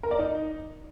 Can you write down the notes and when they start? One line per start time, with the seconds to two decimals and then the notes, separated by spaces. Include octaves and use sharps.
0.03 A#4
0.11 D5
0.19 D#4